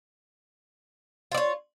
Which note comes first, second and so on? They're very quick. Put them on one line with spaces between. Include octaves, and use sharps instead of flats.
F4 D5 C#5